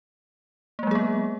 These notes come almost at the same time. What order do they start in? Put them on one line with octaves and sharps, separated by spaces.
A#3 G#3 F#3 G#4 B3